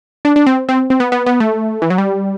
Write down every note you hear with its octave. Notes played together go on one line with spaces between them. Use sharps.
D4
D4
C4
C4
C4
B3
B3
B3
A3
E3
F#3
G3